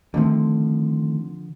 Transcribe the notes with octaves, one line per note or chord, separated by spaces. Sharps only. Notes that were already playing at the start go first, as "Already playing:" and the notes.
D3 D#3 F3 A3 C4